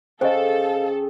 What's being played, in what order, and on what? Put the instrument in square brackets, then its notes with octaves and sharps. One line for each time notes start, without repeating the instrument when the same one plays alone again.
[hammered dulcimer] C#3 G5 C#6 [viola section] A4 [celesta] C5 D#5 [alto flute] F5